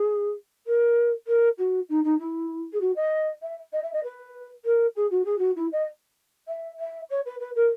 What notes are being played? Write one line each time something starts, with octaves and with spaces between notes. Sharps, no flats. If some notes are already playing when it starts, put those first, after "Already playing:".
Already playing: G#4
A#4
A#4
F#4
D#4
D#4
E4
G#4
F#4
D#5
E5
D#5
E5
D#5
B4
A#4
G#4
F#4
G#4
F#4
E4
D#5
E5
E5
C#5
B4
B4
A#4